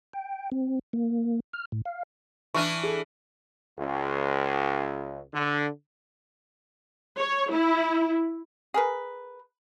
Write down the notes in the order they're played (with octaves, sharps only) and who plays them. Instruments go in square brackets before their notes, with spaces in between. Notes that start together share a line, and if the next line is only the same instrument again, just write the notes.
[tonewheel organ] G5
C4
A#3
F6
A2
F5
[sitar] E3 D4 E4 [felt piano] C#6 F6 D#7
[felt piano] G#4 A4
[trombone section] C#2
D3
[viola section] C#5
E4
[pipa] G#4 A#4 B4